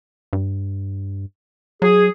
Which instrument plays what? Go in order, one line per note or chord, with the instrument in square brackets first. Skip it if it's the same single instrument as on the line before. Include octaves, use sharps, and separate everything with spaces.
[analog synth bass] G2
[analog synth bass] F#3 [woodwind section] G#4